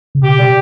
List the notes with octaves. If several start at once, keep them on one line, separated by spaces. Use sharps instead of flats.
C#3
B2 G4
G3